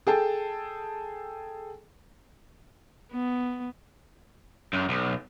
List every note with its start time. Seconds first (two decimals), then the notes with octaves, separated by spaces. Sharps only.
0.07 G#4 A4 G5 A5
3.12 B3
4.73 F#2
4.89 B1